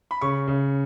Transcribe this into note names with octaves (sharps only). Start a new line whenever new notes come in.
B5
C#3 C#6
C#3